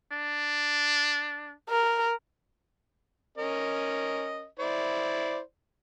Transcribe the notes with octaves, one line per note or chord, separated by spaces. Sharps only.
D4
A#4
C#4 A#4 D#5
E4 C5 D5